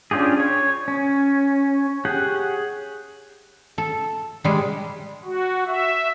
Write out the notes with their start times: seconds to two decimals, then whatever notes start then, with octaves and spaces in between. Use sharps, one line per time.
0.11 C#4 D4 F4 G4 G#4
0.40 C#5
0.88 C#4
2.05 G4 G#4 C#5 F#5
3.78 A4
4.44 G3 G#3
5.25 F#4
5.67 E5